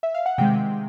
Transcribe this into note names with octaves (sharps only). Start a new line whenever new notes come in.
E5
F5
F#5
C3 D#3 G#3 G5